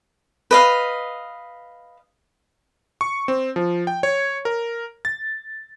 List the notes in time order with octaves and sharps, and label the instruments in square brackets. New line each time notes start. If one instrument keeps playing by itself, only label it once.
[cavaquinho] B4 D#5 F5
[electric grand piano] C#6
C4
F3
G5
C#5
A#4
A6